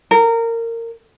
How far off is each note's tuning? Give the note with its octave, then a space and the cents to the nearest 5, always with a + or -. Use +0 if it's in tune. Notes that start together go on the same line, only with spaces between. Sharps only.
A#4 -20